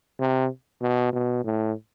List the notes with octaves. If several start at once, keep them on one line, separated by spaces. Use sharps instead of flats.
C3
B2
B2
A2